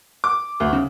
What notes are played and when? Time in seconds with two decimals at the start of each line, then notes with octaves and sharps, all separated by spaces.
0.24 D6
0.60 D2
0.73 C#3